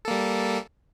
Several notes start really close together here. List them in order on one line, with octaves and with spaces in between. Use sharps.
A4 A#3 G3